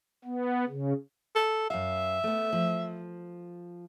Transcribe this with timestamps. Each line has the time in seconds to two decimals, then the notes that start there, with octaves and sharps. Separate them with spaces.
0.25 B3
0.69 C#3
1.35 A4
1.70 F#2 E5 F5
2.24 A3 B3
2.52 F3